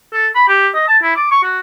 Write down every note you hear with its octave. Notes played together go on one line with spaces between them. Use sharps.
A4
B5
G4
D#5
A5
E4
D6
C#6
F#4